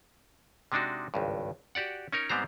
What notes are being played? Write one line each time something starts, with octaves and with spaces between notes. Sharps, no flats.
C3 G#3 D4 D#4 F#4
G#1 C#2 G2
F#4 G4 D5 F#5
C#4 D#4 A#4 C#5
G#2 G3 B3 C4 C5 A#5